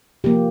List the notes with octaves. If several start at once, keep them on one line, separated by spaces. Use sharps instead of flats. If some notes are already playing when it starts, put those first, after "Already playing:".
C3 F3 A#3 G4